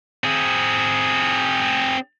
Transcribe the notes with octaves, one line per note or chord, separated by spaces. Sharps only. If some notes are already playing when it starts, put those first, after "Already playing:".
C4 G#4